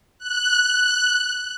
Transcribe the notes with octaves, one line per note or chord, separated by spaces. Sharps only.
F#6